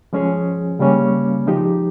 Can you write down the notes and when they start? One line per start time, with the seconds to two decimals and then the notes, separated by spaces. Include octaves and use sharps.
0.13 F3 G#3 C#4 G#4
0.79 C#3 G3 A#3 C#4
1.47 F3 G#3 D#4 G4